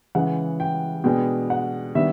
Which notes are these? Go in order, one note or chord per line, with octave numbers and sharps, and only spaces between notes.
C#3 E3 G#3 F#5
G5
B2 G#3 B3 D4 G5
F#5
D#3 G3 B3 D4 E5